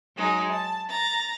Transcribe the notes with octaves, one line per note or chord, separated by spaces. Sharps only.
F#3 G#3 D#4
A5
A#5 A6